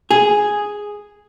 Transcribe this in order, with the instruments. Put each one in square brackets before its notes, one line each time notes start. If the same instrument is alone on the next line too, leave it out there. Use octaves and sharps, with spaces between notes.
[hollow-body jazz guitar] G#4